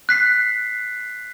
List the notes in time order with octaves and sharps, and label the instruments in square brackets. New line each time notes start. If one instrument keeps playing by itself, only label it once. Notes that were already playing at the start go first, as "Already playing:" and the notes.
[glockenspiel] F#6 B6 C7